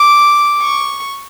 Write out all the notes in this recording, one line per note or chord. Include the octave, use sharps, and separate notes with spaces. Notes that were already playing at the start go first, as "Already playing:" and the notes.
Already playing: D6
C#6